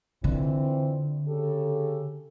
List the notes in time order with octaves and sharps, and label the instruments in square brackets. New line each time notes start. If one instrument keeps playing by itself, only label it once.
[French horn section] F2 E3 C4 [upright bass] D3
[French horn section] C#3 G4 A4